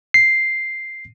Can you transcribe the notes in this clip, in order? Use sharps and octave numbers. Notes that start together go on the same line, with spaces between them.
C7